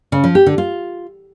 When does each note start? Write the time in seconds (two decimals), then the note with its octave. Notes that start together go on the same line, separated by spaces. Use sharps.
0.12 C#3
0.24 F3
0.35 G4
0.46 D3
0.58 F4